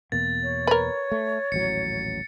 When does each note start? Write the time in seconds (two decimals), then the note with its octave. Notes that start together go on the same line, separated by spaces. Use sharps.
0.12 E2 B2 A#3 A6
0.42 C#5
0.67 A#4 B4
1.11 A3
1.52 D#1 A1 F#3 C#7